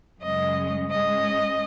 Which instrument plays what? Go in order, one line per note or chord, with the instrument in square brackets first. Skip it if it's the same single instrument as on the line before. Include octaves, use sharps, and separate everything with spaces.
[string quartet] F#2 C#3 G#3 C#4 D#5
G#2 G#3 C#4 D#5